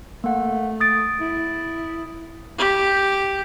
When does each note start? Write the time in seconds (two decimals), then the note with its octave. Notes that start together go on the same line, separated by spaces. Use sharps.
0.24 A3 A#3 F#5
0.81 D#6 A6 D7
1.20 E4
2.58 G4